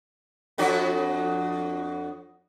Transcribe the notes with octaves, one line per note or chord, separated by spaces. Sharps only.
F2 D4 F#4